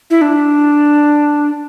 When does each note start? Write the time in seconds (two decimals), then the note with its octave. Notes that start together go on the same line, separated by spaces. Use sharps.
0.10 E4
0.21 D4